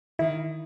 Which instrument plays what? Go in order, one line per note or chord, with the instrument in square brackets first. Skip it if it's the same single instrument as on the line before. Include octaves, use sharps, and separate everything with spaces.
[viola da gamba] D#3 [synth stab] E4